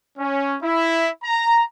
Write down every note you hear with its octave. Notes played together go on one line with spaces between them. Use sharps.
C#4
E4
A#5